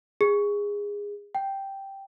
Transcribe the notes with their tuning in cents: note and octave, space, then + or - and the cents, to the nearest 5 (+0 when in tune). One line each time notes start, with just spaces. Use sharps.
G#4 -20
G5 -5